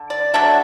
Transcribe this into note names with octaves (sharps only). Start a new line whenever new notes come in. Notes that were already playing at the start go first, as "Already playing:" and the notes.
Already playing: D3
D5
F#3 A3 D4 E5